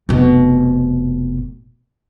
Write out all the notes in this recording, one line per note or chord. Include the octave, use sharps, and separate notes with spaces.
F1 B2